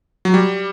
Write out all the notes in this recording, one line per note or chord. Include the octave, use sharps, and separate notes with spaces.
F#3
G3